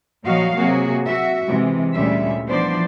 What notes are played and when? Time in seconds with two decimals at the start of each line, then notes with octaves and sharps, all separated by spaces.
0.24 A#2 F3 F#3 F#4 D#5 F5
0.56 C3 F#3 A#3 F#4 G#4
1.05 F#4 E5
1.47 C3 E3 G#3
1.93 D2 A#2 G3 G#3 C#4 E5
2.47 E3 F3 B3 D4 C5 D5